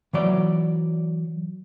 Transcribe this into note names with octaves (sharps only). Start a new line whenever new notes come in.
E3 F#3 D5